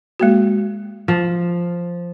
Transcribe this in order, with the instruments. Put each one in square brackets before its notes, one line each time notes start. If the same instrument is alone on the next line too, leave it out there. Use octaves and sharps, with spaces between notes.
[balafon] G#3 A#3 F#4
[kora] F3